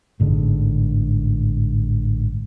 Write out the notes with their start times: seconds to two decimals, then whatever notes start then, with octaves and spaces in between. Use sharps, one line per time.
0.20 A1 G#2 D3